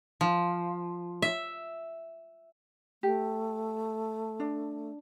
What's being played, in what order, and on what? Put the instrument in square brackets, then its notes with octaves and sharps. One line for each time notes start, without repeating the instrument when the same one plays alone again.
[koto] F3
E5
[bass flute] A3 [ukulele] G4
[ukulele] D4